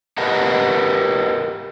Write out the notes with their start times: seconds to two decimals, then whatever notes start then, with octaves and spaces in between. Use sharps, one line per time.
0.18 G4 A#4 B4 D#5 F#5